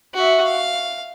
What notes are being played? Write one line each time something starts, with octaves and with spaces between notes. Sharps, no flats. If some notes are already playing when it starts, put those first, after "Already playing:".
F#4 E5
F5